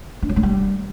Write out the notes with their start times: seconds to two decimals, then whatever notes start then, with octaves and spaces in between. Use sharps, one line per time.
0.22 D4
0.29 F#3
0.36 G#3
0.43 G3